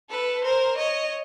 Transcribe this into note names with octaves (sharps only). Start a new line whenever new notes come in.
A4 B4
A#4 C5
C#5 D#5